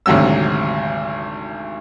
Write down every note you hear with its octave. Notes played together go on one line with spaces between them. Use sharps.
G#1 D2 C3 F#3 E6